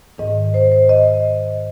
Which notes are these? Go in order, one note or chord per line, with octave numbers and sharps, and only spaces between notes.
G#2 D#3 D#5
C5
C5
D#5